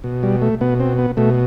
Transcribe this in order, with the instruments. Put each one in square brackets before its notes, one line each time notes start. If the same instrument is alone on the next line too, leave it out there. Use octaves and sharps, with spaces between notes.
[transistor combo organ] B2
G3
A3
B2 B3
C4
B3
B2 A3